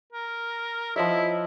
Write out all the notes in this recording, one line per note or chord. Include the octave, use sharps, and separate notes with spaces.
A#4
F3 E4 D#5 E5